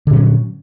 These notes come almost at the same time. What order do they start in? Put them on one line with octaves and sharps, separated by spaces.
D3 A#2 C#4 F#3